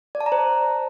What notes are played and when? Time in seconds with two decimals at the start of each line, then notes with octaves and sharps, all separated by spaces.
0.15 D5
0.21 A5
0.26 A#5
0.32 C5